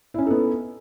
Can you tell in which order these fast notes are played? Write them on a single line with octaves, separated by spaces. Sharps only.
E4 C#4 D#4 A4 B3